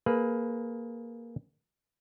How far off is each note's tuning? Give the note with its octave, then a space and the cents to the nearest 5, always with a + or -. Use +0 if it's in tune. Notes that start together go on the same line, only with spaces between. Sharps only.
A#3 +0 G#4 +25 B4 +0